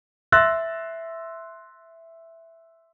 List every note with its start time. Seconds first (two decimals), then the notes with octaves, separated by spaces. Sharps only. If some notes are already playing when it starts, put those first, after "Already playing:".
0.32 E5 C6 E6 F#6 A6 A#6